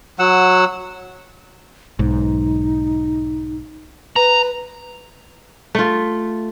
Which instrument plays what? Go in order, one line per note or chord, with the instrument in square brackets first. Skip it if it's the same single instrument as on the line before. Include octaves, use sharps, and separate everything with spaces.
[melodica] F#3 F#5 E6
[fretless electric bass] B1 G#2 [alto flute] D#4
[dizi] B4 [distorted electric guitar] A#5
[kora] A3 F4